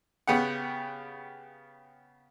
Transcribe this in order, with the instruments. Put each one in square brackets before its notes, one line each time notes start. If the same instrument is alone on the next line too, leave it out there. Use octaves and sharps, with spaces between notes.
[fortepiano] C#3 B3 G4 F#5